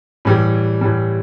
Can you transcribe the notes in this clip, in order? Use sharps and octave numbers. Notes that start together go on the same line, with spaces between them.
A2 E3 G3
A2 E3 G3